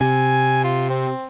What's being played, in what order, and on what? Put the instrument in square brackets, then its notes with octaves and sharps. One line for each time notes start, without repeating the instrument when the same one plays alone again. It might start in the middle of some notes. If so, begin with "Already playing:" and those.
[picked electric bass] C3 [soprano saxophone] G#5
[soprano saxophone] F4
C4